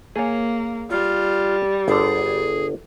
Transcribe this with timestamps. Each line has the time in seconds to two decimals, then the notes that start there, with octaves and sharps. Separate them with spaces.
0.16 A#3 G#4 C#5
0.90 G3 F4
1.88 G1 D3 G#4